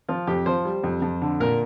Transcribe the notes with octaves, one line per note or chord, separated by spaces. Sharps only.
F3 F4
F2 G4
F3 C5
G3
F2
F2
D3
A#2 A#4